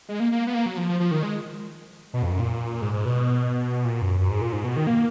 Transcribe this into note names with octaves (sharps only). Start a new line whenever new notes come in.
G#3
A#3
A#3
B3
A#3
F#3
F3
F3
F3
D#3
G#3
B2
F2
F#2
A#2
G#2
G#2
B2
A#2
F#2
F#2
G#2
A#2
G#2
B2
D#3
A#3